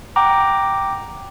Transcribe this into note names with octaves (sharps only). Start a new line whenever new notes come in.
F#5 G5 A#5 D6